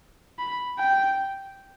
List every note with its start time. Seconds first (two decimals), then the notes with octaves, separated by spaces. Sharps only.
0.38 B5
0.79 G5